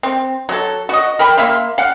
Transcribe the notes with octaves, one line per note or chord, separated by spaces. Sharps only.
C4
F#3 A4
F#4 D#5
A#4 G5 B5
A#3 E5 F5 C6
F5 F#5